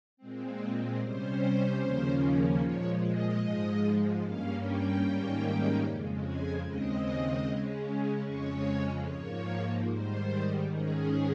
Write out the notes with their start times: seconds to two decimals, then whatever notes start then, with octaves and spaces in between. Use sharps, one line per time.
0.17 A#2 G#3 C4
0.98 C3 G3 C#4 C5
1.79 D#2 C#3 F3 A#3 C#4
2.60 A#2 F3 G#3 C#5
3.00 D#5
3.41 G#2 F3 G#3
4.21 G2 G3 A#3 C#4 F5
4.61 G5
5.02 G#2 D#3 G3 A#3 C#4
5.83 F2 C#3 G#3
6.23 G#5
6.63 D#2 C#3 G#3 C4 D#5
7.45 C#3 G#3 C#4
8.25 F2 C#3 G#3 C#4 C#5
9.06 G#2 F3 A#3 C#5
9.87 G#2 D#3 G3 C5
10.67 G#2 D#3 G#3 C#4 G#4